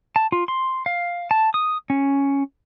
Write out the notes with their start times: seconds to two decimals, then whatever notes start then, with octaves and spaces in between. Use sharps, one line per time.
0.16 A5
0.32 F4
0.48 C6
0.86 F5
1.31 A5
1.54 D#6
1.90 C#4